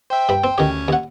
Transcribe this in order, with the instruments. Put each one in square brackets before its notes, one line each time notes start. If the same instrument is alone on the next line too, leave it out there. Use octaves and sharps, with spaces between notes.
[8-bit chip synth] C5 E5 [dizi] G5
[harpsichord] G2 B5
[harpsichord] C4 [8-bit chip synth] C5
[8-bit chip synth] D2 C#4 C#5 [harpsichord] D#3 G4
[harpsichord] D#2 F#5